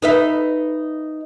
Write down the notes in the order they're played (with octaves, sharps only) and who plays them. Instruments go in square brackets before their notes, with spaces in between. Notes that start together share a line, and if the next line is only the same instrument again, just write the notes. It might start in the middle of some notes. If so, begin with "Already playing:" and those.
[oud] D#4 B4 E5